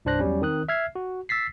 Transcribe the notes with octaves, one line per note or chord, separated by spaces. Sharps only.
C2 G2 D4 C5 F#6 A#6
E2 F#3 G3 C#4
D#3 C4 D#6 F#6
E5 F6 G#6 C7
F#4
E6 A6 B6 C7